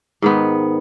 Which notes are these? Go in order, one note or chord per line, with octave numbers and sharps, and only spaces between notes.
G#2 D#3 B3